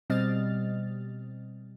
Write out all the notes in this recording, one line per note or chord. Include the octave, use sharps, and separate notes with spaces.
B2 G3 C4 D#5 F6 A6